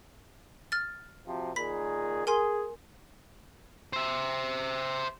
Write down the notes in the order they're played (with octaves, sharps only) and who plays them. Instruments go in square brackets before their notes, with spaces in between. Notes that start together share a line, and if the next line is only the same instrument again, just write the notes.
[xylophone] F6 A6
[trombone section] C3 F3 F#4
[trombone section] A#2 D#3 G#4 [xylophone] B5 B6
[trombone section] G#4 [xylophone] A#4 G#5 C6
[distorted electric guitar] C5 E5